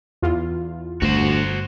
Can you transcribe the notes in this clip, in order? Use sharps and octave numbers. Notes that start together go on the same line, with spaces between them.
E2 F4
G1 D2 F#4 C5